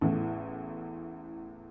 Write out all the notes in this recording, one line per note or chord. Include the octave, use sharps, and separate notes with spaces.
A1 E2 A2